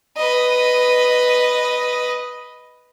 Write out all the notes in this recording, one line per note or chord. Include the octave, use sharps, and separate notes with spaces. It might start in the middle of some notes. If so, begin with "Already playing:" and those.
B4 D#5